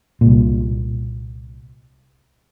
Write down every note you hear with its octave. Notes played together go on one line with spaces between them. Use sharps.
C2 A#2